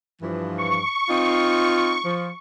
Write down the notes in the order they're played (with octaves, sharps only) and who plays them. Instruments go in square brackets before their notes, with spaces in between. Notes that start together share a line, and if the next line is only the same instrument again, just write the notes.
[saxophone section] G2 E3 F3
[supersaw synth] C#6
[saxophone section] C4 D#4 F4
F3